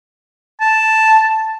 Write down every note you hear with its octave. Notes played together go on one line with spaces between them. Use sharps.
A5